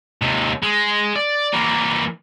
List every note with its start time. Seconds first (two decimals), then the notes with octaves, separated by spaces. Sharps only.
0.22 D#2 C3
0.63 G#3
1.16 D5
1.53 E3 A#3